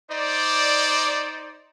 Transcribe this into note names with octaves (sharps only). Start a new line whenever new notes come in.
D#4 C5 D5